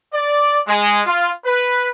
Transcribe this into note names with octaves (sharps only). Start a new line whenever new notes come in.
D5
G#3
F4
B4